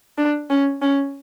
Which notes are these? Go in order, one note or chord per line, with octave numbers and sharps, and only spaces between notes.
D4
C#4
C#4